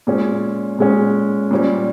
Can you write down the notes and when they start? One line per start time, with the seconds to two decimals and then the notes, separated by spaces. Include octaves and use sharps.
0.07 A#2 G#3 C#4
0.78 A#2 G#3 C#4
1.51 A#2 G3 C#4